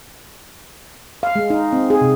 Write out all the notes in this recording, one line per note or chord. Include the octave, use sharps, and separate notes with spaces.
F5
G#3
D#4
C4
G#4
C3